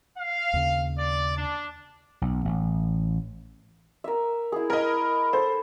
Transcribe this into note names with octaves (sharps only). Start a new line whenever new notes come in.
F5
D#2 C#3
D5
D4
B1
A1
A#4 E5
E4 G#4
A#4 D#5 G#5 B5
A4 C5